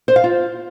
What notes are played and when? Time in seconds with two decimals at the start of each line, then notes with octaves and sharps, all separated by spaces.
0.08 C5
0.16 F5
0.24 F4